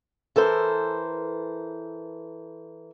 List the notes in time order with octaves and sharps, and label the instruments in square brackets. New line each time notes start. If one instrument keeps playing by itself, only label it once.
[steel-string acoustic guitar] E3 A4 A#4 C5